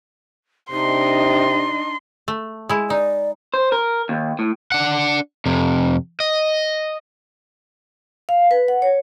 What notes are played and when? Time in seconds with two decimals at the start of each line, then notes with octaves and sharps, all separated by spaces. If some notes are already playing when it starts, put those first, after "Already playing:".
0.71 C3 D4 D#4 D#5 C6
2.28 A3
2.69 G#3 E4
2.90 D#4 D5
3.54 C5
3.72 A#4
4.09 D#2
4.39 A2
4.72 D4 F#5
5.46 F2 C3
6.20 D#5
8.29 F5
8.51 B4
8.68 F#5
8.82 C#5